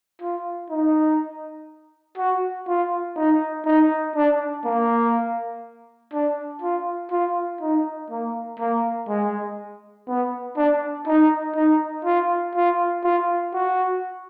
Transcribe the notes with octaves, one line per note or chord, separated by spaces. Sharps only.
F4
D#4
F#4
F4
D#4
D#4
D4
A#3
D4
F4
F4
D#4
A#3
A#3
G#3
B3
D4
D#4
D#4
F4
F4
F4
F#4